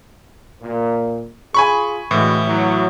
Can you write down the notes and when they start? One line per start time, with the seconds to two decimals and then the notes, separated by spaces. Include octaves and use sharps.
0.62 A#2
1.54 F4 G#4 G#5 B5 C#6
2.11 D2 A2 E3 G#3 F#4
2.46 F#3 E4